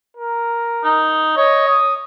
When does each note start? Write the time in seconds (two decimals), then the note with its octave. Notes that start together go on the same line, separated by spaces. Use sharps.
0.17 A#4
0.84 D#4
1.37 C#5 D#5
1.68 D#6